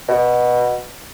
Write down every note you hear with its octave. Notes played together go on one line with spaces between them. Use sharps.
B2